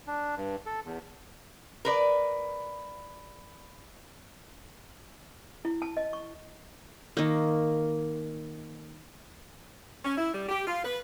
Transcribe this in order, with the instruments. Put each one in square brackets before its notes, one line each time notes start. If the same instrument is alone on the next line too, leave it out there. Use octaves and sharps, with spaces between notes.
[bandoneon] D4
G2
A4
E2
[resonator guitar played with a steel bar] A#4 B4 D5
[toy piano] E4
A5
D#5
C#6
[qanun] D#3 A#3
[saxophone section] C#4
E4
G3
G4
F4
B4